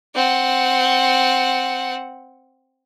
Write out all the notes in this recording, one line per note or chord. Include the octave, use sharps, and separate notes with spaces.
C4 F#5